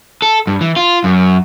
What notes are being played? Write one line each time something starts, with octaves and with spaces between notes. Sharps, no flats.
A4
G2
E3
F4
F#2